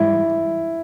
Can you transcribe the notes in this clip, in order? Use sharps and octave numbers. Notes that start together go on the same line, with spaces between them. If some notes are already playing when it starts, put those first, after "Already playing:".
Already playing: G#2 E3 G3 E4